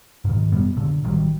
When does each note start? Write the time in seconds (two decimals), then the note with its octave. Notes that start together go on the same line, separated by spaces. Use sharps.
0.25 G#2 B2 D#3
0.52 F#2 G3 B3
0.76 A#2 D3
1.04 A1 D#3 F#3 G3